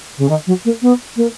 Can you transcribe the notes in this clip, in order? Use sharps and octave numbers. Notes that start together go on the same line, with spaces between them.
C#3
D#3
F#3
A#3
B3
A#3